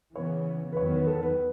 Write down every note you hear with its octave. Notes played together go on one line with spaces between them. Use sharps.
C#3 E3 B3 C#5
B4
E2 D#3 F#3 B3 C#5
B4
A4
B4